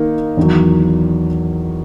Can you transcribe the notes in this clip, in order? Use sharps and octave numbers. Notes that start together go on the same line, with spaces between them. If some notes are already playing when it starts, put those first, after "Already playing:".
Already playing: D#3 A#3 D#4
E2 D#3 F#3